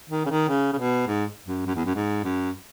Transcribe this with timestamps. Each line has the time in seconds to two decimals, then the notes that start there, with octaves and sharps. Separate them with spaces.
0.10 D#3
0.25 C#3
0.30 D#3
0.49 C#3
0.73 C#3
0.78 B2
1.07 G#2
1.46 F#2
1.66 F#2
1.75 E2
1.85 F#2
1.95 G#2
2.24 F#2